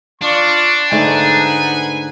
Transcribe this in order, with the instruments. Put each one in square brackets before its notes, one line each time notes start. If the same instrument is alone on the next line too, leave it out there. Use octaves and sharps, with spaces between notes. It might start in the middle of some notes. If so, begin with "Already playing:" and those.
[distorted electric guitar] D4 [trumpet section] F4 D5 [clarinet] C#6
[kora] G#2 D3 A3 [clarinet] D#4 [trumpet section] B4 F#5 G#5